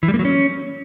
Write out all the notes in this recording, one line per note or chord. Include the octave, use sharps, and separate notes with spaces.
E3
G3
A#3
F#3
C#4